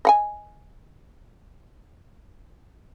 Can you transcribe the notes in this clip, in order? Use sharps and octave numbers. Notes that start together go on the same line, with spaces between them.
D#5 F#5 G#5